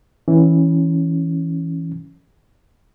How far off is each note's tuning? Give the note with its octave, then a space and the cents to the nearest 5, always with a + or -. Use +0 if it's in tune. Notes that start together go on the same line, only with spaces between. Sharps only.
E3 -10 C#4 +0